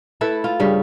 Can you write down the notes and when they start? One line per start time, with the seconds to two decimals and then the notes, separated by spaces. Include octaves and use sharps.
0.21 A3 E4 A4 B4
0.44 F4
0.60 G2 C#3 G3